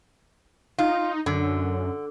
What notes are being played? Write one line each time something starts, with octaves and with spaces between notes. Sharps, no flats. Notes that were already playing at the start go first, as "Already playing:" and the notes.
D#4 F4
F#2 D3